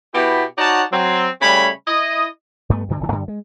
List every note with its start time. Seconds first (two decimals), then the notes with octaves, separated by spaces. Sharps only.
0.13 B2 B3 E4 G4
0.58 D#4 F#4 C#5 D5 F#5 A5
0.92 F#3 C4
1.42 C#3 G3 A3 C#4 C#5 B5
1.87 E4 D#5
2.70 G2 A3 B3
2.89 D2 G2 D3
3.01 D1 C3 D#3
3.12 F#2 D3
3.28 G#3